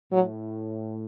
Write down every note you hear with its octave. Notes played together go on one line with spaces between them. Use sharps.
A2 F#3